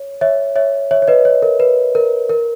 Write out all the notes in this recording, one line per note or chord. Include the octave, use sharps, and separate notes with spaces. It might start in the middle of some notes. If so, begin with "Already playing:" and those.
Already playing: C#5
C#5 E5
C#5 E5
C#5 E5
C#5
B4 D#5
C#5
A#4
B4
A#4
A#4